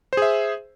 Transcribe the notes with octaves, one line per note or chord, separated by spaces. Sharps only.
G#4 C5 E5